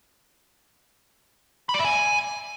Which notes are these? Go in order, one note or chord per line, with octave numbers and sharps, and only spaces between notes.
B5
D5
E5
G#5